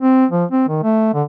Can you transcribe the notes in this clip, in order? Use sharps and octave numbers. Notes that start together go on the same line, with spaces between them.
C4
F3
C4
D#3
A3
D3